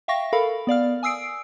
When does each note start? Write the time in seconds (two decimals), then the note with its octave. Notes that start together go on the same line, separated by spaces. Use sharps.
0.08 E5 F5 G5 C#6 A#6
0.33 A4 A#4 F5 B5
0.67 B3 D5 F5 F6
1.03 G#5 D#6 E6 C7 D7